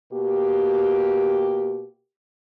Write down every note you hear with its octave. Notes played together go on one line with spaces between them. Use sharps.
B2 A#3 G4